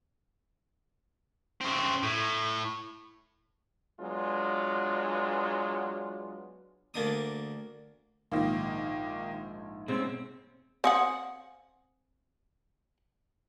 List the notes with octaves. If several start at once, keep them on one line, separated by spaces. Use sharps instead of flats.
C#3 C4
A2
F#3 G#3 B3 D4 F4
D2 A#3 D4 D#6
A#1 G#2 D#3 A#3 F5
B2 G#3 C4 C#4
C4 F5 F#5 G#5 D#6